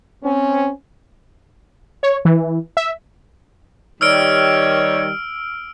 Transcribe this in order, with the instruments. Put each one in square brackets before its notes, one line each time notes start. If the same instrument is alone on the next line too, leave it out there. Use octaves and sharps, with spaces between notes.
[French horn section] C4 C#4
[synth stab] C#5
E3
E5
[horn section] D#3 G3 [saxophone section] C#5 [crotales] E6 F6 D7